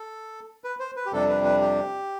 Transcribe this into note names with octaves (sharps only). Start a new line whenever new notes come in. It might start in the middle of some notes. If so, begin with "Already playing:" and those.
Already playing: A4
B4
C5
B4
G4
F2 C3 G3 D4 A4
B4
B4
G4